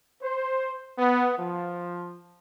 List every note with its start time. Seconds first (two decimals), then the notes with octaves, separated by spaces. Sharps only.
0.22 C5
0.98 B3
1.37 F3